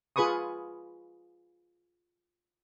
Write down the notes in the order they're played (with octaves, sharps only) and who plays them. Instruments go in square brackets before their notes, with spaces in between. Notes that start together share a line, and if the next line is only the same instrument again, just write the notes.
[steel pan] F4 G#4 B4 B5 C#6 D#6